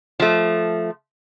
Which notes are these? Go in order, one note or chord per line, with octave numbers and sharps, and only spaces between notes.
F3 A3